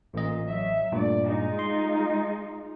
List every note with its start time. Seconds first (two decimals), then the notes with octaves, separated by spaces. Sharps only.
0.14 A1 A#2 D#5
0.46 F#3 E5
0.92 G2 A#2 A3 D5
1.24 G#3 D#4 F4
1.59 C6